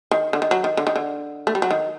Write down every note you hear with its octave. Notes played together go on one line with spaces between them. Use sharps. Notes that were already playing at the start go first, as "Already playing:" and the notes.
D#3
D3
D#3
F#3
D#3
D3
D#3
D3
A3
G3
F#3
D#3